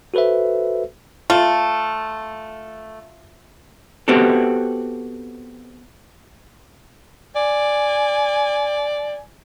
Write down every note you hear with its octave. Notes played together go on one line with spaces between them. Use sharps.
F#4 A4 B4 C5 E5
A3 F4
B3 C4 F#4 G4 A4
D5 G#5